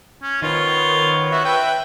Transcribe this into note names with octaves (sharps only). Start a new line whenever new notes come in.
C#4
D#3 B3 F4 C5 C#5
F#4 E5
B4 E5 G5